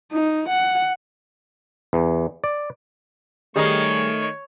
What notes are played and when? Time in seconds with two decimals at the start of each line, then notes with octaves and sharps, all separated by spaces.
0.12 D#4
0.49 F#5
1.93 E2
2.44 D5
3.56 D#3 G3 A3 D#4 G#4 A#4 C#5 C7